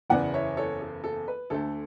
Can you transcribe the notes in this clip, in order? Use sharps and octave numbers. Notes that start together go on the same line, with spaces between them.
F#1 E2 C#3 E3 B3 D5 F#5
C#5 E5
A4 C#5
A4
A4
B4
D2 D3 A3 A4